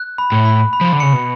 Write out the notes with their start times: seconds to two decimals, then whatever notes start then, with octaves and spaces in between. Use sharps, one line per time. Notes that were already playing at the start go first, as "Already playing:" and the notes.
Already playing: F#6
0.18 B5
0.32 A2
0.45 B5
0.73 B5
0.81 F3
0.92 D3
1.00 C#3 C#7
1.13 B2